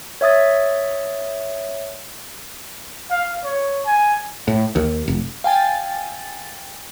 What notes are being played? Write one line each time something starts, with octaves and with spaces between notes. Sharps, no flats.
C#5 E5 D#6 A6
F5
C#5
G#5
A2
D#2
F1
F5 G5 G#5 A6